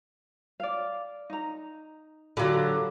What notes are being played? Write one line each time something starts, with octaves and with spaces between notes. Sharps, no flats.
D5 F5
D#4 A#5
D3 F#3 F4 G4 B5